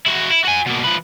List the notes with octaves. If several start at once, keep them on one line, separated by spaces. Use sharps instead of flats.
E4 F#4
E4
F#4 G#5
B2 A#3
F3 B4